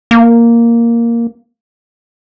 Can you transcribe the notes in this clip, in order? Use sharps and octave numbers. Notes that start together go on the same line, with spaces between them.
A#3